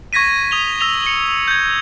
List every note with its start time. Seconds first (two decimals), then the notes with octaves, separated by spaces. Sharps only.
0.13 C#6 G#6 A#6 B6 D#7
0.51 D#6 F7 G7
0.80 E6 A#6 B6 F7 G7
1.02 C#7 G7
1.48 G6 G#6